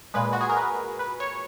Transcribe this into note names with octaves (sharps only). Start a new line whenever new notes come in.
A#2 G#3 B4
F#4
G#4
A#4
B4
B4
C#5